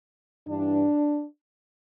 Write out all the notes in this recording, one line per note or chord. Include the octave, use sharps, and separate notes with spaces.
G2 E3 D4